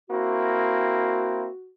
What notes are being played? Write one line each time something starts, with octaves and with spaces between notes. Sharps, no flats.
A#3 C4 E4 F#4